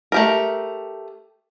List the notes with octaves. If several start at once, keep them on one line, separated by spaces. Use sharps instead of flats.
A3 G4 A#4